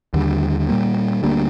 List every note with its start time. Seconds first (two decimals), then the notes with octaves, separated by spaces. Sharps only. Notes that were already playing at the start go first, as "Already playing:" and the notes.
0.14 D#2 D3 G3
0.68 A#2 G3 A#3
1.23 D2 D3 G3 A#3